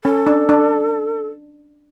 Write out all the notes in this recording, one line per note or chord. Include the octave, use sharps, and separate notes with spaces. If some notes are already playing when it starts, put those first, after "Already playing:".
C#4 A4
D4
D4